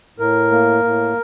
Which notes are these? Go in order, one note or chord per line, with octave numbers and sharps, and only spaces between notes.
A2 A#4
A#3
A2